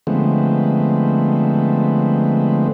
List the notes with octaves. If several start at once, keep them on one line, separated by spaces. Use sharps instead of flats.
D3 F3 G#3 A3 B3 C4